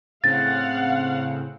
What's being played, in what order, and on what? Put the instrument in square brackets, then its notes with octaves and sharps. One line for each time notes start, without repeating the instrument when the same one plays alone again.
[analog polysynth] A2 C#3 C4 [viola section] F5 F#5 [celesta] A6